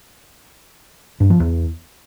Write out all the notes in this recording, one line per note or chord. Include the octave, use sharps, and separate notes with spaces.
G2
F3
E2